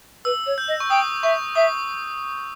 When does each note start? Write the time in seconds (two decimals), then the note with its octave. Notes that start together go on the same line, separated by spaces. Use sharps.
0.25 B4 E6
0.46 C#5
0.58 G6
0.68 D#5
0.80 C#6
0.90 G5 D#6
1.23 E5 C#6
1.55 E5 D#6